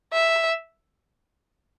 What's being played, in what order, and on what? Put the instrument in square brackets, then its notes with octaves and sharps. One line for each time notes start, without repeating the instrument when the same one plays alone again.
[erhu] E5